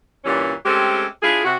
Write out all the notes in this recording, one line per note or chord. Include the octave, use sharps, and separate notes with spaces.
G2 A#2 E3 G3 C#4
G#3 A3 C4 C#4 G4 A4
D4 E4 F4 G#4
C3 F#4